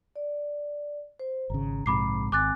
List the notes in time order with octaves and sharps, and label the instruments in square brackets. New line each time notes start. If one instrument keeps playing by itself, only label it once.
[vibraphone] D5
C5
[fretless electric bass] G#1 C#3 [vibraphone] A#5
[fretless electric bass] A#1 G#2 C3 [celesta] B5 D6 C7
[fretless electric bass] G#1 [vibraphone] C4 G#5 [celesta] D6 F#6 A6